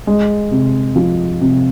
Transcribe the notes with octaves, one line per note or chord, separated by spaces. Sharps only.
G#3
C3
F3
C3